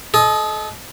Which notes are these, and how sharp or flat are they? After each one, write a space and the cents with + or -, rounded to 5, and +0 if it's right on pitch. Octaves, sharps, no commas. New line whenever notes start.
A4 -35 D#5 +0